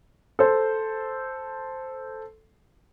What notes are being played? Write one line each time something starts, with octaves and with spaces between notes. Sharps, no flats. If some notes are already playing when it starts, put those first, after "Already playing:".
A4 C5